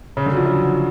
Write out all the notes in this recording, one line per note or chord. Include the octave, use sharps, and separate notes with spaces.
C#3
D3
F#3
F3
F#3